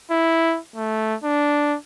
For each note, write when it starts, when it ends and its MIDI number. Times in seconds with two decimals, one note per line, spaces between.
0.11 0.59 64
0.76 1.15 57
1.24 1.76 62